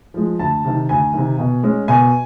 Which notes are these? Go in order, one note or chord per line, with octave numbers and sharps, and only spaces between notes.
F3 G#3
D2 A5
C3 D#3
D2 G#5
C3 D#3
B2
G#3 C#4
B2 G#5